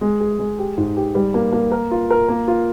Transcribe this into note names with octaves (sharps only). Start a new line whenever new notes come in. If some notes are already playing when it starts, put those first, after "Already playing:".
G#3
G#4
G#3
G4
G#2
G4
G3
A#3
A#3
A#4
F4
A#4
A#3
F4